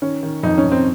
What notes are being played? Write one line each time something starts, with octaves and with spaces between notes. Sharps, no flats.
D#3 C#4
D#3
F2 D#4
C#4
F2
C4